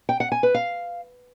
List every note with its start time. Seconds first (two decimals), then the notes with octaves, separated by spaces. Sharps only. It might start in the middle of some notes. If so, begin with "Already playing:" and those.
0.09 G5
0.20 F#5
0.32 G#5
0.43 B4
0.54 F5